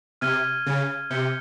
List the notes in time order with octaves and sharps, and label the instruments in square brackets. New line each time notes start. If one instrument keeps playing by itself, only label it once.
[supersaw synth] C3 [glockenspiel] F6 G#6 D#7 G7
[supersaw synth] C#3
[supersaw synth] C3 [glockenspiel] G6 C#7 G7